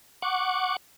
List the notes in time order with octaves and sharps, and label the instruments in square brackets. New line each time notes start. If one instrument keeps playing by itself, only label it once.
[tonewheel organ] F#5 C#6 D6